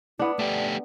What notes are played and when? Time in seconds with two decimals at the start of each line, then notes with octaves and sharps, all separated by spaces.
0.19 B3 D4 E4
0.39 A3 G4 D5